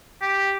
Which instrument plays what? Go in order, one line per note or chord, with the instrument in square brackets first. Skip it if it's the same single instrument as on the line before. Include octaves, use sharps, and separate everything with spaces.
[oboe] G4